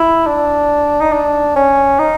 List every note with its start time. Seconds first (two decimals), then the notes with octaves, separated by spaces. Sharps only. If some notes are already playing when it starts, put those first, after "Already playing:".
Already playing: E4
0.27 D4
1.01 D#4
1.13 D4
1.56 C#4
1.99 D#4